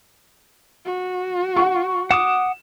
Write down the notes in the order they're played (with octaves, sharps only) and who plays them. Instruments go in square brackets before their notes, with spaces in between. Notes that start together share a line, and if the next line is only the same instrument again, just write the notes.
[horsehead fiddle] F#4
[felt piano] F#5 C#6
[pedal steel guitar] F#5 D6 D#6 [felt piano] E7